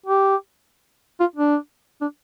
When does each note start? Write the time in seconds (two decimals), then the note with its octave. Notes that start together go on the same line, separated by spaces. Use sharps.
0.06 G4
1.20 F4
1.36 D4
2.01 D4